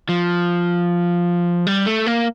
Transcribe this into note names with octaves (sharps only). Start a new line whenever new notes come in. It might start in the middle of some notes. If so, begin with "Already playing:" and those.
F3
G3
A3
A#3